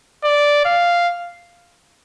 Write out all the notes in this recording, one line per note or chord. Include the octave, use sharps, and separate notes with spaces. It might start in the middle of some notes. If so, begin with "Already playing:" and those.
D5
F5